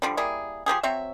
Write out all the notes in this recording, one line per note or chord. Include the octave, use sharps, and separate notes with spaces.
D3 F3 G3
G3 A#3 E4 G#4
F3 A#3 G4 G#4
F#3 C4 C#5 E5